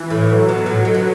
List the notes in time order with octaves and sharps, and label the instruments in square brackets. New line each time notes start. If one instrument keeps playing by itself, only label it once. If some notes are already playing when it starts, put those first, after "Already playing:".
Already playing: [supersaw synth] E3
[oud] A2
[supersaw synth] F#3
[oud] B2
A2
B2
D3